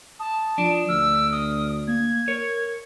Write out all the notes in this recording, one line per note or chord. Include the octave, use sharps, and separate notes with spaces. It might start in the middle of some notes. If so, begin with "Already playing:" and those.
A5 D#6
F3 D4
D2 E6 F6
D#6
A#3 G#6
A#4 C#5